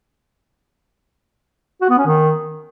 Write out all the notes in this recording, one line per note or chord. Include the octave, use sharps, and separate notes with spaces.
F#4
B3
C#4
D#3